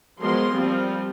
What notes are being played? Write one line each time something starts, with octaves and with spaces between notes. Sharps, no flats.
F3 F#3 G#3 B3 A#4 C6
F3 G3 A#3 C4 F4